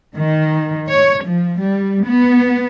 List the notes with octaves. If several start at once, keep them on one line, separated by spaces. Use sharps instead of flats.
D#3
C#5
F3
G3
B3